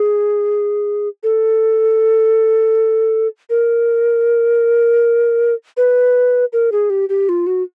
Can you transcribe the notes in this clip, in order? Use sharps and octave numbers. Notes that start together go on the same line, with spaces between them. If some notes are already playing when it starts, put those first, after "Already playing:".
Already playing: G#4
A4
A#4
B4
A#4
G#4
G4
G4
F4
F#4